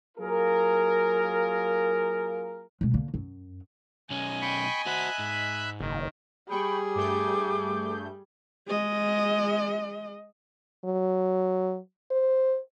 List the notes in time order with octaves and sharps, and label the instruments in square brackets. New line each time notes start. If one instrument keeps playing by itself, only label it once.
[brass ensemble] F#3 A#3 F4 G#4 A#4
[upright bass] B2 G#3
D3 A#3
F#2
[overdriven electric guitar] B1 C#4 [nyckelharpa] D#5 G#5
[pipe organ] G5 B5 C#6
[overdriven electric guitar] F#4 C5 [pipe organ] E5 B5 F#6
[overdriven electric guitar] G#2
[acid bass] F#1 [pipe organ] D#3
[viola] G3 [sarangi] G#4 [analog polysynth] G5 C#6 [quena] B5
[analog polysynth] G2 A3 G6 [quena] D6
[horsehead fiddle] G#3 D#5
[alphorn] F#3
C5